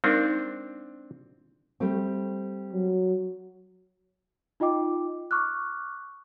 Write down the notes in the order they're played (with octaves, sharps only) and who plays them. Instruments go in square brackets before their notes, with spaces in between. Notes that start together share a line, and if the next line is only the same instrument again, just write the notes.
[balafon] G#3 D#4 A#4 [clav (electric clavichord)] C4 D4
[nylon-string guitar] G3 A3 C4
[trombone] F#3
[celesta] D#4 F4 D#5 G5 D6
C#6 D6 F6 F#6